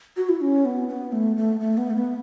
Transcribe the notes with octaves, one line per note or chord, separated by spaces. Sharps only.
F#4
E4
C#4
B3
B3
A3
A3
A3
B3
A3
B3